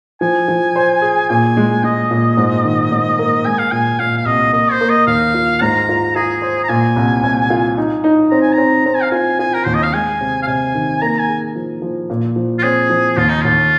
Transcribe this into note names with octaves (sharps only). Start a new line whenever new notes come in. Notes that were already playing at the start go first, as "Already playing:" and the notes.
F3 G#5
F3
C5
G#4
A#2 G#5
G#3
G#3 D#5
A#2
G#2
D#3
G#2
A#3
G#3 G#5
F5
A#2 G#5
A#2 F5
F5
C2 D#5
A#3 D#5
C5
A#3
D#5
D#2 F5
F4
G#2 A#5
F4
F4 G#4
C5
A#5
A#2 G#5
C2
C2
F4
D#4
D#4
C4 A#5
G#5
A#5
C4
C4 A#5
G#5
F5
F4 G#5
F4 G#5
A#4
D#2 C5
D#5
F5
G#3 G#5
C3
F5
C3 G#5
D#3
A#3 A#5
G#5
G#4
F3
F3
A#2
F3
F4
C4 G#4
F3
D#2 F4
D#4
D#2 F4